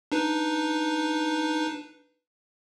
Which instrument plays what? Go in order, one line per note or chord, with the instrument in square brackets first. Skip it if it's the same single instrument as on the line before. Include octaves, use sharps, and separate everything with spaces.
[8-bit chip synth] D4 D#4 B4